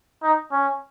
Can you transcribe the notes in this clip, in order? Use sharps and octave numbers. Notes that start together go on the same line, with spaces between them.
D#4
C#4